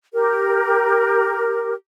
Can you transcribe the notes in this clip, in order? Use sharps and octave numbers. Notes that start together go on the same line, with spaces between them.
G4 A#4